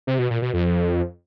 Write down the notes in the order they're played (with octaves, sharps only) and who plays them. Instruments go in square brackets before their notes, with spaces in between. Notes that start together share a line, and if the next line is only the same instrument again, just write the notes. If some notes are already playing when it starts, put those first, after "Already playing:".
[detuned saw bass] C3
B2
A#2
B2
F2